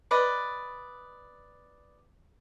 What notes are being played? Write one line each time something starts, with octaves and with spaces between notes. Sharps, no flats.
B4 D5 D#5